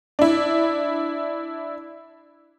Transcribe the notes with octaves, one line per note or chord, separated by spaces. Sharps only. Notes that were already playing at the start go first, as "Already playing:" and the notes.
D4 E4